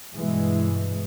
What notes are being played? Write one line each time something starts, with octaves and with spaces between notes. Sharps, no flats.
G2 B2 E3 G#3